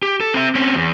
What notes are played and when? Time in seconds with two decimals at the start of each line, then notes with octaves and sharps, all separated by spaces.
0.03 G4
0.20 A4
0.34 C4 E5
0.55 C4 C#4
0.75 E2